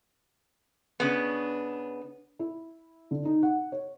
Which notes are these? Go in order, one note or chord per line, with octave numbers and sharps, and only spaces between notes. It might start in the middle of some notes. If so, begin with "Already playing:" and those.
C#3 B3 D4
E4
D3
D#4
F#5
C#5